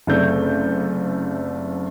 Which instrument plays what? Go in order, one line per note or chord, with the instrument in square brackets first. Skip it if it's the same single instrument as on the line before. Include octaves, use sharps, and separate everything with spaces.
[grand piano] F#1 C3 A3 A4 D5 G6